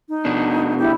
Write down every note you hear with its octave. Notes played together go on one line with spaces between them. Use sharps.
D#4
B2 D4
E4 G4